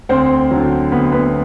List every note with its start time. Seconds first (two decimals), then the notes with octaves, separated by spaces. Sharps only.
0.09 D2 C4 C5
0.51 D3 F#3
0.92 D2 B3 B4
1.12 B3 B4